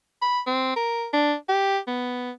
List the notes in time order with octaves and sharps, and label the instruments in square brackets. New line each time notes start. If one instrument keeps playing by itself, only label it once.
[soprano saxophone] B5
C4
A#4
D4
G4
B3